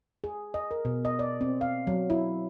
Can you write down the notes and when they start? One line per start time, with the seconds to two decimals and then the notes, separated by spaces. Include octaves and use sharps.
0.24 G#4
0.54 D#5
0.71 A#4
0.85 B2
1.05 D#5
1.19 D5
1.41 C4
1.61 F5
1.87 F#3
2.10 E4